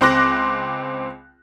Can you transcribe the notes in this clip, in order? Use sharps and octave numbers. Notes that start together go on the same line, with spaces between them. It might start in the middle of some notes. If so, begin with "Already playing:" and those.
C#2 C4 C6 D6 F#6 A#6